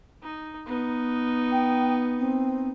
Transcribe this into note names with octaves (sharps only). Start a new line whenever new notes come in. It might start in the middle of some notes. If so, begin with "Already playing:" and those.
D#4
B3 D#4
G5
C4